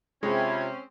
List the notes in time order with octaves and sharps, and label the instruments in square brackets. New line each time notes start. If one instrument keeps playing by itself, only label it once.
[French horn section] C3 [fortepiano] G#3 [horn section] C4 C#4 [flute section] F4 B5 G#6